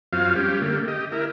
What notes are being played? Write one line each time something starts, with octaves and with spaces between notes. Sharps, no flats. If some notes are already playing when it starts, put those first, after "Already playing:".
F#2 F#3 C4 F4 F5
G3 C#4 G4
D3 A3 A#3
G4 D#5
E4 A#4